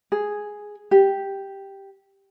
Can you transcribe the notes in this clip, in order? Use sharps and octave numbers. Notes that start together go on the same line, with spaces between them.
G#4
G4